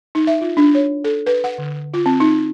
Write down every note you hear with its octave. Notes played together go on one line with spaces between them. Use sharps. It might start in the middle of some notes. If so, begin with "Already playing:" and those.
D#4
E5
F4
D4
C#5
A4
B4
F#5
D3
F4
C4
D#4